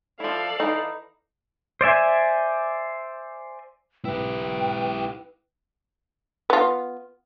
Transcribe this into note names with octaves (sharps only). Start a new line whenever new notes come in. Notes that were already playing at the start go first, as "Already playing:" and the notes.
F3 E4 A4 D5 F5
E3 D#4
C5 D5 E5 G#5
E4 G4 B4 G5
B3 F4